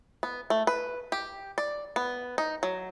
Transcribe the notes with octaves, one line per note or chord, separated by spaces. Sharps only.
B3
A3
B4
G4
D5
B3
D#4
F#3